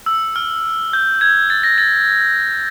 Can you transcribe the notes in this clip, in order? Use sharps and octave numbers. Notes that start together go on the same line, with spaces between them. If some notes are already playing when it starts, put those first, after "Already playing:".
E6
F6
G6
G#6
A6
A#6
A6